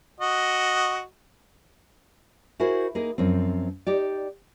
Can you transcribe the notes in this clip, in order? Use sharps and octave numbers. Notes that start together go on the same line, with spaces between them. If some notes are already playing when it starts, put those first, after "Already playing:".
F#4 D#5
E4 F#4 G#4 A#4 C5
A#3 D#4 G#4 A#4
F#2 F3 C4
D#4 G4 D5